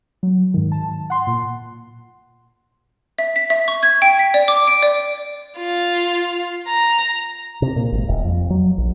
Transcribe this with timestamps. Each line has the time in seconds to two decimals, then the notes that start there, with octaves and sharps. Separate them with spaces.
0.23 F#3
0.54 G#2 D#3
0.72 A5
1.10 F#5 C6
1.27 A#2
3.19 E5
3.36 B6
3.50 E5
3.68 C#6
3.83 G#6
4.02 G5
4.19 B6
4.34 D5
4.48 D6
4.67 D7
4.82 D5
5.58 F4
6.68 A#5
7.62 C3
7.76 A#2
7.92 G#1
8.08 D#1
8.24 F2
8.50 F#3
8.78 A#1